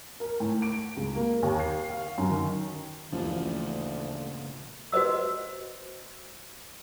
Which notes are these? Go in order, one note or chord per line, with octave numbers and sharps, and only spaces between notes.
A#4
A2
D7
C#2
A#3
D#2
C7
F5
F#2
D#3
A1 D2 A#2 C#3 F3
F#4 B4 C5 D#5 E6